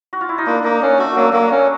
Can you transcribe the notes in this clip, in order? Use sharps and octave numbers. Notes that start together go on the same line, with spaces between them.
F#4
F4
E4
D#4
A#3 D4
A#3 D#4
C#4 D4
A3 F#4
F#3 A#3
F#3 A#3
C#4